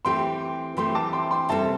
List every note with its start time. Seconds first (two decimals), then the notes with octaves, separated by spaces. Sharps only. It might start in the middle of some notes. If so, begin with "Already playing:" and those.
0.05 E3 A3 C4 G4 G5 C6
0.77 E3 A3 C4 G4 G5 C6
0.95 A5 D6
1.13 G5 C6
1.31 G5 C6
1.49 C3 G3 C4 A4 E5 A5